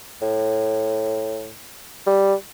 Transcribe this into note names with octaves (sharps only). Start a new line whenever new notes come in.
A2
G3